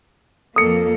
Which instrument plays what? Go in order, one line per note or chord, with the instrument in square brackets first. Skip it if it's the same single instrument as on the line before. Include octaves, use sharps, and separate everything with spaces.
[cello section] F2 A#3 [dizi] A4 [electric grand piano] D#6 C#7